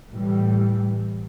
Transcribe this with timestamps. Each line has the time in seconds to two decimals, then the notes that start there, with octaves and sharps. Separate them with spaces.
0.12 A2 E3 G3